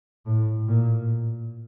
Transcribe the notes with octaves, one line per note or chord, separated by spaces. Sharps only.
A2
A#2